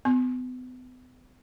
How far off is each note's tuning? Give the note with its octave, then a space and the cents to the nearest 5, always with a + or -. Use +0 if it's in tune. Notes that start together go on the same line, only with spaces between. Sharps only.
B3 +40 C6 +40